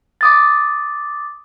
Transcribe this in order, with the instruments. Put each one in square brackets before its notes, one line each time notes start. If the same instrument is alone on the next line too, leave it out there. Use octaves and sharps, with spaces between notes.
[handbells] D6 D#6 A6